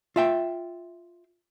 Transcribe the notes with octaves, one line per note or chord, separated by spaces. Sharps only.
F4 E5 G5